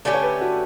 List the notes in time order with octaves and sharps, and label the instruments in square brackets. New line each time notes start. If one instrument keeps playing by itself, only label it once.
[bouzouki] D3 A3 C#4 G4 [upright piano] D5
[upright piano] C#5
B4
F#4